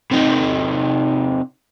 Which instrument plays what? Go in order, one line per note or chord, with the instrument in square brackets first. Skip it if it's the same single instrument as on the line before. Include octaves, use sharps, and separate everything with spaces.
[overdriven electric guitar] C3 D#4